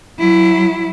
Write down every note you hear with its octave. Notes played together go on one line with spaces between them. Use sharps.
F#3 E4